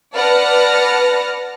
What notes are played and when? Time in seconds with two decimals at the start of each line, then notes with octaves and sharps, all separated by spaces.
0.13 B4 D5 F#5 A5 F6 A#6